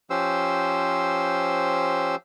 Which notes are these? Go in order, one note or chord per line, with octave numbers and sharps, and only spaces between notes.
F3 C#4 G4 C5 E6